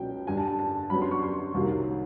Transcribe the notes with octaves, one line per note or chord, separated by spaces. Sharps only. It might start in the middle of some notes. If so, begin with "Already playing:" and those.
Already playing: C#2 B2 F#3 A#3 C#4 G5
G2 D3 G3 G#5
A5
A5
A5
F#2 D3 F#3 B3 B5
C6
C#6
C6
C2 C3 D#3 F#3 A#3